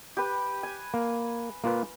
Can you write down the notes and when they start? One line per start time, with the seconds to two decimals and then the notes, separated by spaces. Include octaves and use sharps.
0.17 G4 B4
0.63 G#5
0.94 A#3
1.64 A#3 F4 B4